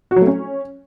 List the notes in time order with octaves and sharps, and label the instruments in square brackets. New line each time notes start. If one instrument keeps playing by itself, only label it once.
[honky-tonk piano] F#4
F#3
A3
C#4